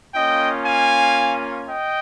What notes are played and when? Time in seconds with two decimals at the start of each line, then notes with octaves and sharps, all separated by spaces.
0.14 A#3 C#4 F4 D#5 G5
0.65 F5 G#5
1.68 D#5 G5